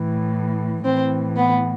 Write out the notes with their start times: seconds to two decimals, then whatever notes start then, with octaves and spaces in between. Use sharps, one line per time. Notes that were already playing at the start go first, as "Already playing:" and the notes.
Already playing: A2 E3
0.85 A2 E3 C4
1.36 B3